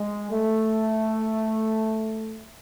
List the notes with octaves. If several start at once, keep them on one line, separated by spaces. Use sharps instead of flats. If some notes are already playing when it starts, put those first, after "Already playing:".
Already playing: G#3
A3